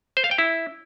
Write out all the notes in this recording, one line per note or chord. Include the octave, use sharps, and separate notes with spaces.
C5
F5
G5
E4